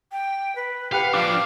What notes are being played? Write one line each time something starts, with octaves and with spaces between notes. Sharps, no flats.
G5
B4
G4 B4 F5 F#5
F3 D4 F5 D6